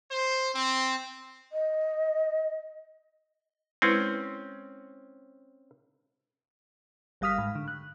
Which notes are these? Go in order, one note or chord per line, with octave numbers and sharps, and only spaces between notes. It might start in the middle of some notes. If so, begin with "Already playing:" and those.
C5
C4
D#5
G#3 C4 C#4 E4 B4
G1 G3 F5 D#6 F6 B6
G#2
D3
F#6